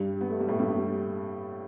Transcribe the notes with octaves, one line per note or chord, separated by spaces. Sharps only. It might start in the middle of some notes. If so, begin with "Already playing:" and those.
Already playing: G2 G3
B3
A3
G3
A2 A3
G2 G3